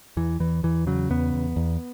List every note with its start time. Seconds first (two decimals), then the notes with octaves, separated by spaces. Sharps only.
0.17 E2 E3
0.40 E2 E3
0.63 E2 E3
0.87 C#3 F#3
1.10 E2 B3
1.34 E2
1.56 E2